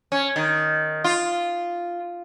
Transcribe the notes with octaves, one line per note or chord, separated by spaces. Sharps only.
C#4
D#3
F4